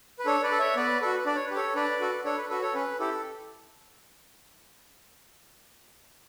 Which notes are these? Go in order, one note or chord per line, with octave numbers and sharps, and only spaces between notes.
B4
D4 A4 C#5
B4 D5
A4
C#5 E5
B3 B4 D5
F#4 A4 B4
D4 D5
C#5
G4 B4
A4 C#5
D4 B4 D5
F#4 A4
D4 A4 C#5
B4
F#4 A4 B4
A4 C#5
C#4 B4
E4 G4 A4